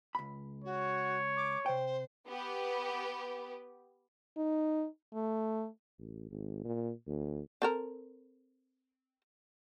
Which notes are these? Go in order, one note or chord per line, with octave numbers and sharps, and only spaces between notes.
C#2 B5
F#4 C#5
D6
C3 C5 G5
B3 G4
D#4
A3
A1
G#1
A#2
D2
C4 A4 A#4